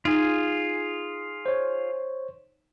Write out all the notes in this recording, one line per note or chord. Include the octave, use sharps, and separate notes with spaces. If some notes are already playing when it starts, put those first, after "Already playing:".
D#4 F4 G#4
C5 C#5